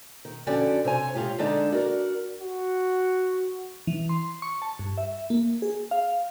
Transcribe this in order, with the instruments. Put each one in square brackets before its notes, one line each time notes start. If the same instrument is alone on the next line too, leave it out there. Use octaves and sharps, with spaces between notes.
[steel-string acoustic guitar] D#3
F2 D3 C#4 F#4 D5 G5
C3 C5 C#5 G#5
G#2 C#3 F4 G4 C#5
D3 G#3 D4 D#4
F#4 A#4 D5
[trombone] F#4
[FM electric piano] E3
C6
C#6
A5
G2
E5
A#3
G#4
F5